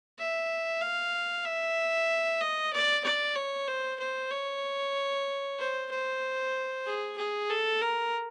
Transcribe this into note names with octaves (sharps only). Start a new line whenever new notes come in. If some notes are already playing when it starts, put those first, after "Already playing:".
E5
F5
E5
D#5
D5
D5
C#5
C5
C5
C#5
C5
C5
G#4
G#4
A4
A#4